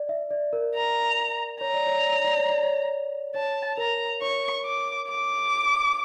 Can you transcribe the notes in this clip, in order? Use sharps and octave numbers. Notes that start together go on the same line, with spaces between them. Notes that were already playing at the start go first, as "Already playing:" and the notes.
Already playing: D5
E5
D5
A#4
A#5
C#5 A#5
D5
C#5
D5
C#5
D5
C#5
D5
C#5
C#5 A5
A#4 A#5
C#5 C#6
D6
D6